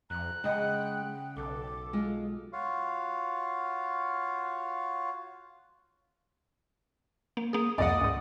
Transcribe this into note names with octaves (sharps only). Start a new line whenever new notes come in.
F2 A#5 F#6
C#3 G#3 D#5 F#5 G5
B1 A4 D6
G#3 F4
F4 F#4 C#5 F5
A#3
A#3 G#4 D#6
C2 F2 G#2 D5 D#5 F#5 D#6
C#2 G#2